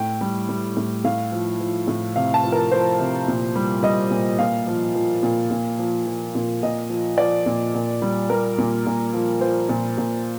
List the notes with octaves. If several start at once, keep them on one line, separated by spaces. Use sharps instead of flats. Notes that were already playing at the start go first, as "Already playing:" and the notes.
Already playing: A2 G5
G3
G3
A2
A2 F5
F3
F3
A2
C3 F5
A5
F3
A#4
F3 C5
C3
A#2
G3
G3 D#5
A#2
A#2 F5
F3
F3
A#2
A#2
F3
F3
A#2
A#2 D#5
F3
F3 D5
A#2
A#2
G3
G3 A#4
A#2
A#2
F3
F3 C5
A#2
A#2